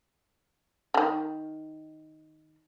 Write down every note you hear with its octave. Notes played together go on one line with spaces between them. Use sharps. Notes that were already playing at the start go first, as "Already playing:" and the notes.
D3 D#3